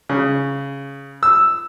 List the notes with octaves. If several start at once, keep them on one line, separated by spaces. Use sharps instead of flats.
C#3
E6